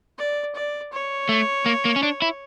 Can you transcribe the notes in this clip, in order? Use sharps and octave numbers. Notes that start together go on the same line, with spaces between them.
D5
D5
C#5
A3
A#3
A#3
C#4
D4
E4